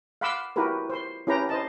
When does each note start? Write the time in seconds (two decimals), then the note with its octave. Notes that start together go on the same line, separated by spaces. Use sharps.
0.21 F5 F#5 B5 C6 D6 E6
0.56 E4 F#4 G4 A#4 B4
0.90 C5 C6
1.27 C#4 E4 G4 B4 G5 A#5
1.49 C5 D#5 A5